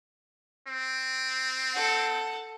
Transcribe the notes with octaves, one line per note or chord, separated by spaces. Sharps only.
C4
A4 F#5